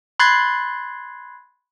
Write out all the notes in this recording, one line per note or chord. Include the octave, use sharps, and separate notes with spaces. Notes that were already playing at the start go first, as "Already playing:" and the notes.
B5 C6 F#6 G#6 A6 C7